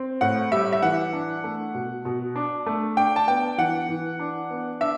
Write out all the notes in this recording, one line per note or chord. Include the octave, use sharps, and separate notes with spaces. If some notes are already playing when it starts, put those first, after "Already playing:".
Already playing: C4
A2 F#5
G3 E5
E5
E3 F#5
D4
A3
B2
B2
D4
A3
D4 G5
A5
B3 G5
E3 F#5
E3
D4
B3
D4 E5